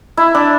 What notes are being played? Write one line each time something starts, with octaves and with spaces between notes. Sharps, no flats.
E4
D4